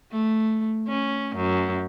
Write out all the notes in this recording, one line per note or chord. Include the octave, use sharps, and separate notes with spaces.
A3
C#4
F#2